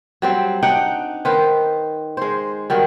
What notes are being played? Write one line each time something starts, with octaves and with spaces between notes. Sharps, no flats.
F#3 G3 C4
D4 D#4 F#5 G5
D#3 B4 C5
G#3 C5
D#3 F#3 G3